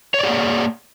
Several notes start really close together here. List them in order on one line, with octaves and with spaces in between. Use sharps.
C#5 D5 G#4 A#3